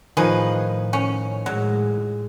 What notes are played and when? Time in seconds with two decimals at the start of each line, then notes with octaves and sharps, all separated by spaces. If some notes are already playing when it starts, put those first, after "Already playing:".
0.17 A2 D#3 F3 D#4 G#4 B4
0.93 C#4
1.46 A2 F#3 G#3